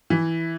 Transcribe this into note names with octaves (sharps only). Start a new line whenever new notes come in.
E3